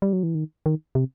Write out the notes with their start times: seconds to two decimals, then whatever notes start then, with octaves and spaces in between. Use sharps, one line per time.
0.02 G3
0.13 F#3
0.23 E3
0.35 D#3
0.66 D#3
0.95 C3